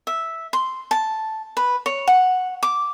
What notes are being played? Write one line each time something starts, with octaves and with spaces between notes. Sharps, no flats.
E5
C6
A5
B4
C#5
F#5
D6